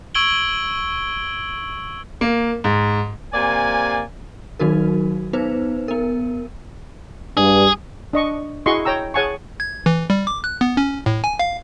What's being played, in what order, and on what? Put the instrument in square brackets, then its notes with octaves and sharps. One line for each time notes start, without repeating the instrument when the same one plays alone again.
[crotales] C#6 E6 G#6 D7 F#7 G7
[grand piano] A#3
G#2
[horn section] C3 A#3 D5 G#5
[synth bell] D#3 F#3 D#4 F#4 A#4
B3 D#4 B4 C5
B3 A#4
[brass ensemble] G2 [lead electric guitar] G#4
[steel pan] D4 D#5 C#6
E4 F#4 G#4 D#5 C6 C#6
C#5 G5 A#5 E6
G#4 C#5 F#5 G#5 A5 C#6
[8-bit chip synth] G#6
E3
G3
D6
F#6
B3
C#4
A2
G#5
F5